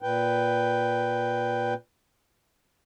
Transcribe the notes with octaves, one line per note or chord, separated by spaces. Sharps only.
A#2 B4 G5